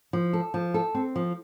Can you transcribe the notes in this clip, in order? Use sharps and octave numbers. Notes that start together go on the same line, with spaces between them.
F3
A4
F3
A4
C4
F3